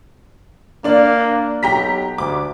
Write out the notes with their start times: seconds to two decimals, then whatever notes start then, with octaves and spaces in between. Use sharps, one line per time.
0.84 A#3 D4 D5
1.63 B1 G4 A#5 B6
2.18 D2 D6